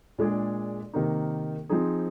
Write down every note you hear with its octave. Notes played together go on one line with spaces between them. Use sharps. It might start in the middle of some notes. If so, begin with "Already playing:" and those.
A#2 G#3 D4 G#4 D5
C3 D#3 A#3 D#4
F3 C4 D#4 G#4